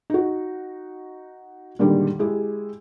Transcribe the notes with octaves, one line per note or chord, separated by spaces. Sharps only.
D#4 F#4
A#2 D3 D#3 G3 G#3
G#3 E4 G4